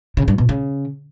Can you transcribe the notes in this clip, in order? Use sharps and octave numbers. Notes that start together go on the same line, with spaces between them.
C#3
G2
B2
C#3